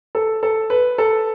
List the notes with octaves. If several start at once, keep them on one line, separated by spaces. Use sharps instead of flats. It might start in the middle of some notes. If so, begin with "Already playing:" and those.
A4
A4
B4
A4